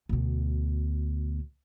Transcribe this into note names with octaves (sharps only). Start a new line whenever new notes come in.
D2 B2